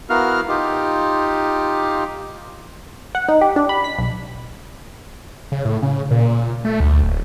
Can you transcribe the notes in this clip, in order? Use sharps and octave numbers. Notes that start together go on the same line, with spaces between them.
B3 E4 F#4 A#4 F5 F6
D#4 F4 G4
F#5
D#4
G4
D4
B5
B6
B1
C#3
A2
C#3
A#2
A3
D2
D1